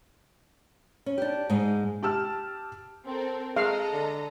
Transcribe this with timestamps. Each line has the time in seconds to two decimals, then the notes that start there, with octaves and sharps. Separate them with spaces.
1.06 C#4
1.18 D4 G4
1.50 G#2 G#3
2.03 G4 A5 E6 F6
3.05 C4 A4 A#4
3.57 G#3 A4 D#5 F5 A#5
3.93 D3